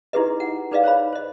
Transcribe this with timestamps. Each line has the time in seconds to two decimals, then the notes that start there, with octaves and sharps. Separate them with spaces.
0.13 D#4 E4 G4 G#4 B4 D#5
0.40 F#5
0.71 D#4 G#4 B4 D5 D#5 F5
0.84 C5 C#5 F5 B5
1.13 C5 D#5